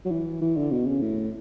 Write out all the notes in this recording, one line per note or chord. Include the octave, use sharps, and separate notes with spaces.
F#3
E3
E3
D3
B2
C#3
A2